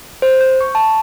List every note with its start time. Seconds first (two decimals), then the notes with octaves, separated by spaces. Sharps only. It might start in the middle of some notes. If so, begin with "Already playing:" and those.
0.22 C5
0.41 G6
0.61 C#6
0.75 A5